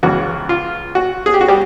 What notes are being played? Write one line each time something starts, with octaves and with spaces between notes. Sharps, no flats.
C#2 C#3 E3 F#4
F4
F#4
G#4
G4
F#4
G3 G4